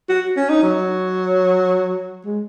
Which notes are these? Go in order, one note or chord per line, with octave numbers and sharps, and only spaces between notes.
F#4
C#4
D#4
F#3
G#3